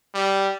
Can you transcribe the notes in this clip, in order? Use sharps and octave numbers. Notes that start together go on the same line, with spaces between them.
G3